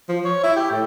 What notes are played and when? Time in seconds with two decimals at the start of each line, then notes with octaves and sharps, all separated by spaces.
0.09 F3
0.25 C#5
0.43 E4
0.56 G4
0.71 A2